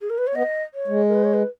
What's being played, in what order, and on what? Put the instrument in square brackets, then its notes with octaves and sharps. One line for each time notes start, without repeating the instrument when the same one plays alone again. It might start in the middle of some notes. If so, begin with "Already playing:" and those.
[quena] G#4
A#4
B4
C#5
[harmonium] B3 [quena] D#5
[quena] C#5
[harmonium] G#3
[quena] A#4
B4
C#5
B4